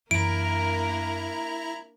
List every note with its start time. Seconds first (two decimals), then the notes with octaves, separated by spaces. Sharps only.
0.11 F#2 E3 A#3 D4 E4 A#4 A#5 D7